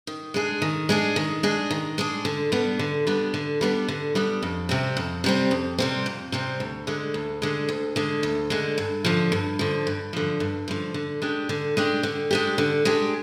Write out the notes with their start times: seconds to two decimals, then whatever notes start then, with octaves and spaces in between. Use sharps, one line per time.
0.07 D#3
0.34 G#3 D4 G#4
0.62 D#3
0.89 G#3 D4 G#4
1.16 D#3
1.43 G#3 D4 G#4
1.71 D#3
1.98 G#3 D4 G#4
2.25 D3
2.52 G3 B3 D4
2.79 D3
3.07 G3 B3 D4
3.34 D3
3.61 G3 B3 D4
3.89 D3
4.15 G3 B3 D4
4.43 F2
4.69 C3 G3 C4
4.97 F2
5.24 C3 G3 C4
5.51 F2
5.79 C3 G3 C4
6.06 F2
6.32 C3 G3 C4
6.60 D2
6.87 D3 G#3
7.14 D2
7.42 D3 G#3
7.69 D2
7.96 D3 G#3
8.23 D2
8.50 D3 G#3
8.78 G2
9.05 D3 F3
9.32 G2
9.59 D3 F3
9.87 G2
10.13 D3 F3
10.40 G2
10.68 D3 F3
10.94 D3
11.22 G#3 D4 G4
11.49 D3
11.77 G#3 D4 G4
12.03 D3
12.31 G#3 D4 G4
12.58 D3
12.85 G#3 D4 G4